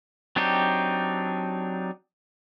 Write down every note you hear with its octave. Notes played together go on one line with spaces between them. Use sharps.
F#3 C4 D4 D#4 G4